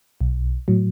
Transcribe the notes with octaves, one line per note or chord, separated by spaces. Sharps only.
B1
A2 F#3